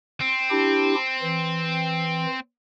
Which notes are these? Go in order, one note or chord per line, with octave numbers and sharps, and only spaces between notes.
C4
D4 E4 G4
E3